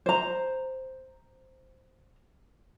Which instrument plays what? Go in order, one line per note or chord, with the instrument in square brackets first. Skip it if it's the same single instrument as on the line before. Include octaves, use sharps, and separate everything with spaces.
[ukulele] C5 A#5